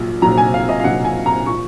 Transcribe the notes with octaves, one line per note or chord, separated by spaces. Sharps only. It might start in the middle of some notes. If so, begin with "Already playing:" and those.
Already playing: A#1 A#2 F#3
A#1 A#2 F#3 A#5
G#5
F5
D#5
F5
A#1 A#2 F#3 F#5
G#5
A#5
A#2 F3 C#6